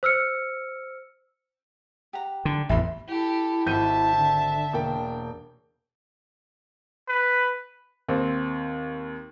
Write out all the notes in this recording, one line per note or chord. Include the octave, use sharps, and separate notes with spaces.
C5 E6 F6 C#7
G4 F#5 A#5
D3
A1 E2 E5 B5 C6
E4 G4 A4
G#1 E5 A5 G6 D#7
D3
E1 A#3 D4 G5
B4
D#2 C4